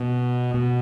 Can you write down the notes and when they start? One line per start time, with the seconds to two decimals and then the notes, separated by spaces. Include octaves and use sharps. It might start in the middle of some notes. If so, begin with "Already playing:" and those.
Already playing: B2
0.54 B2